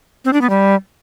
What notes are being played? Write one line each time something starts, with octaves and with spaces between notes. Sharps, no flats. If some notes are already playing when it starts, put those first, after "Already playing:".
C4
D4
B3
G3